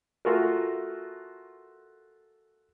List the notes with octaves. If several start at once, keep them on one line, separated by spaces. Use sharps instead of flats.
A3 F4 F#4 G#4 A#4